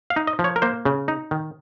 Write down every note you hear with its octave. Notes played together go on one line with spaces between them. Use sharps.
F5
D#4
D#5
F3
C#5
A#4
A#3 C5
C#3
D#4
D#3